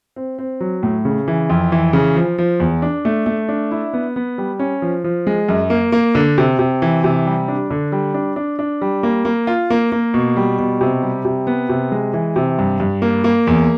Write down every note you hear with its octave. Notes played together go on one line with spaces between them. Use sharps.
C4
C4
F#3
A2
C#3
E3
F2
E3
C#3
F3
F3
E2
D4
A3
A3
D4
E4
B3
B3
G3
C#4
F3
F3
G#3
F#2
A#3
A#3
D3
C3
C3
E3
C3
G3
D4
D3
G3
D4
D4
D4
G3
A#3
A#3
F4
A#3
A#3
B2
G3
B2
C3
G3
C3
B3
C3
G#3
E3
C3
G2
G2
A#3
A#3
E2